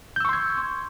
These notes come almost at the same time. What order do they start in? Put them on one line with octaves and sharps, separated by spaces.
G6 E6 C#6 C6 G#6